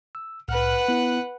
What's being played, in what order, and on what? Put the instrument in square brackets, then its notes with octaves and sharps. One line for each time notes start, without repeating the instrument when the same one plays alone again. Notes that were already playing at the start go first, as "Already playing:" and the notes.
[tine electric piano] E6
[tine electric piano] C2 A2 F6 [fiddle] B4 F#5
[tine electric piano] B3 E4